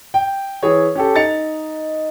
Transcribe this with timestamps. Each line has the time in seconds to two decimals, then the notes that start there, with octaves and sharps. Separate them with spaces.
0.14 G5
0.63 E3 G#4 C#5
0.95 C#4 G4 A4
1.16 D#4 A6 C#7 F7